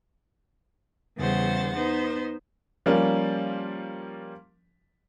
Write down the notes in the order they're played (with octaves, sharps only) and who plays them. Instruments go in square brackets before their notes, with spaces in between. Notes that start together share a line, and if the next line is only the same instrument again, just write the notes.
[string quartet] E2 C#3 G3 C5 F#5 A6
B3 D#4 C5
[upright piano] F3 G3 A#3 C#4